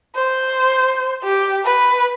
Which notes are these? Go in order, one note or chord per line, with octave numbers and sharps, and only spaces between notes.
C5
G4
B4